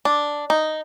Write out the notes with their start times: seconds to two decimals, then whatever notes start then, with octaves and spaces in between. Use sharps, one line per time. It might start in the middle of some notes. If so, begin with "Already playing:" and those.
0.05 D4
0.50 D#4